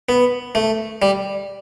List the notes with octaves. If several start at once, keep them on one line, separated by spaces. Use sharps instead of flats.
B3
A3
G3